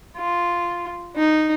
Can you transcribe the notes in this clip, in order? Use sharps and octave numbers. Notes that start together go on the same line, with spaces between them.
F4
D#4